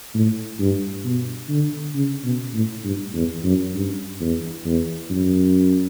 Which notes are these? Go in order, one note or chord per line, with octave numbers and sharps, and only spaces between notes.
A2
G2
B2
D3
C#3
B2
A2
G2
E2
F#2
G2
E2
E2
F#2